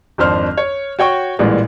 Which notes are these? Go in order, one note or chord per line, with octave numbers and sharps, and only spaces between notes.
G#1 F2 D4 C5 F6
C#5
F#4 C#5 G5 C#6
A1 A#2 E3 G3 G#3